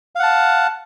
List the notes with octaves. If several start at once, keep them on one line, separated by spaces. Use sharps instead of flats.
F5 F#5 A5